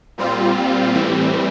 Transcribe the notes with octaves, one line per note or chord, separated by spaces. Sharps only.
A#2 G3 C4 F4
A2 E3 G3 C4